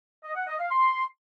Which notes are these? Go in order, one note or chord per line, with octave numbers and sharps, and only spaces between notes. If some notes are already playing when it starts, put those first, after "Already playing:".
D#5
F#5
D#5
F5
C6